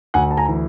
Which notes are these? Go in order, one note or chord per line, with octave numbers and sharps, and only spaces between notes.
D2 F#5 G#5
A5
G#5 A#5
E3